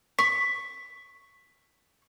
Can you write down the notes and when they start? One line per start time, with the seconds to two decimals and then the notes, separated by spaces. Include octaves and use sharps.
0.19 C#6 B6